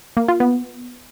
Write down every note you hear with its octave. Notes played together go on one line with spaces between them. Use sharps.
A#3
F4
B3